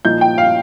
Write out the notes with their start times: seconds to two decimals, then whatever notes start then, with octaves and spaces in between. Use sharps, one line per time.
0.05 A#2 F3 D#4 G6
0.21 G5
0.38 F5